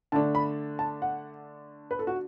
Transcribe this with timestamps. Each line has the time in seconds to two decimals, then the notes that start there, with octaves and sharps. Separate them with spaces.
0.12 D3 A3 D4 A5
0.35 B5
0.79 A5
1.02 F#5
1.91 B4
1.99 A4
2.07 F#4